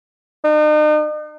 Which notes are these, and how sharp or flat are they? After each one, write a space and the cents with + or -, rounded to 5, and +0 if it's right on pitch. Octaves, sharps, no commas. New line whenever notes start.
D#4 -40